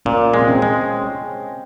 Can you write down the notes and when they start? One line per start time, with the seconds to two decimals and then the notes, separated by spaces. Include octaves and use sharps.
0.06 A#2 C#4
0.34 G#3
0.39 C4
0.48 C#4
0.62 G#3